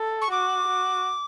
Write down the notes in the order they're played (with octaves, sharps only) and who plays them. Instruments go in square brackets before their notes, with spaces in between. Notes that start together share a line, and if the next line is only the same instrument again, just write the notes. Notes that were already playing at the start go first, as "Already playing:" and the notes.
Already playing: [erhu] A4
[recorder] C#6
[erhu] F#4 [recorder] D6
[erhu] F#4